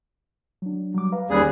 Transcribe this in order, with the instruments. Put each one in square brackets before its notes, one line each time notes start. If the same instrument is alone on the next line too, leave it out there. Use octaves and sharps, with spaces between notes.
[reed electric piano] F#3 D4
F#3 G3 D6
B4 F5 A#5
[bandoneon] D#2 G3 G#4 [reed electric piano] C#4 F#6